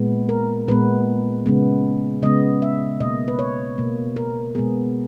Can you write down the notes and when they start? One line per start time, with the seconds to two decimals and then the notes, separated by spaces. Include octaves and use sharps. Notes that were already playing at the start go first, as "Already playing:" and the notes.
Already playing: A#2 G#3 B3
0.29 A#4
0.68 A#2 G#3 B3 B4
1.46 C#3 G#3 B3
2.22 C#3 G#3 B3 D#5
2.62 E5
3.00 B2 A#3 D#5
3.28 B4
3.39 C#5
3.78 B2 A#3
4.16 A#4
4.55 B2 G#3 B3 G#4